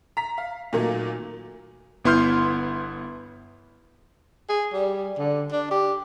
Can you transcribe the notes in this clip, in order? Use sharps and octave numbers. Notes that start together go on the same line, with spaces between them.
A#5 B6
F5
A#2 D#3 F#3 A3 A#3
G1 B3 E4 C6 F6 G6
G#4
G3
D3
D4
G4